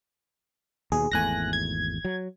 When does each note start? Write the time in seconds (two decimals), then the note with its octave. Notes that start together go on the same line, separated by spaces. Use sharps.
0.92 D#2 B2 G#4
1.12 G#1 E2 A3 G#5 F#6 A#6
1.53 G#6
2.05 F#3